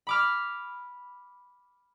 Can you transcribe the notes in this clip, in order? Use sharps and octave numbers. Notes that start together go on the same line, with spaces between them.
B5 D6 F6